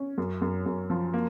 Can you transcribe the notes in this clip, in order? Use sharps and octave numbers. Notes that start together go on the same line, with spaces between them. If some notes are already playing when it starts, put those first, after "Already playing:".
Already playing: C#4
F#2
F#2
F#2
F3
A#3